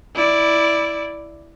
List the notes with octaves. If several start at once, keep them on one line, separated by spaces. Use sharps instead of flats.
E4 D5